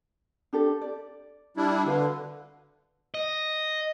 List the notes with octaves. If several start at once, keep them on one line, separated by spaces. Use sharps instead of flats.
D4 G4 A4
D5
G3 D4 E4
D3 F#4 B4 F5
D#5